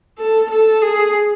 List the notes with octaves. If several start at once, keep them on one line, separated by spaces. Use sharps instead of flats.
A4
A4
G#4